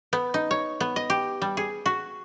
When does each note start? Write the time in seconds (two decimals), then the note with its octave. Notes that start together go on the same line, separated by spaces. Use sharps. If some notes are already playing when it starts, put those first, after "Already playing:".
0.13 B3
0.34 D#4
0.51 C#5
0.80 B3
0.96 D#5
1.10 G4
1.42 G3
1.57 G#4
1.86 F#4